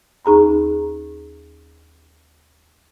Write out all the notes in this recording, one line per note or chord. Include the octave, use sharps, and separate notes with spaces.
D#2 D#4 G#4 A#5 B5